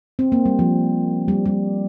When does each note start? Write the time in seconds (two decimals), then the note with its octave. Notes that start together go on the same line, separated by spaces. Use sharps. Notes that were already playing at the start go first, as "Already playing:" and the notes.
0.19 C4
0.32 A#3
0.46 G3
0.59 F3
1.28 G3
1.46 G3